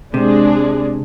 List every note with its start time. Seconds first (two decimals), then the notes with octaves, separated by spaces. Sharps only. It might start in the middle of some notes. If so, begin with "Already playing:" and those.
0.14 C3 G#3 D4 G#4